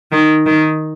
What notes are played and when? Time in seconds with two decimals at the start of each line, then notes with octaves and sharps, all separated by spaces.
0.11 D#3
0.45 D#3